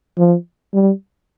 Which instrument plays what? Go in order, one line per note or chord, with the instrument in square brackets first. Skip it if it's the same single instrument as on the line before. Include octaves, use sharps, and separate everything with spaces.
[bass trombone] F3
G3